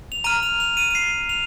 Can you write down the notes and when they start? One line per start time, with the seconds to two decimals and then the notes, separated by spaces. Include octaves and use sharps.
0.12 F7
0.24 A#5 F6 D#7
0.43 F7
0.60 F7
0.77 D#7
0.90 D#7
0.95 C7
1.29 F7